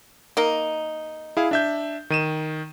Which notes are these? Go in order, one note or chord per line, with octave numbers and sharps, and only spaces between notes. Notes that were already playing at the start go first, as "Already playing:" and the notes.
A#3 D#4
E4 G#4 F5
D4 E5 G6
D#3 D#7 E7